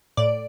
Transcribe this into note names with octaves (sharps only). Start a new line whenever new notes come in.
A2 D5